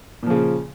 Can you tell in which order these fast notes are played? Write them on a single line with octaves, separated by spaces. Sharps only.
A#2 F3 C#3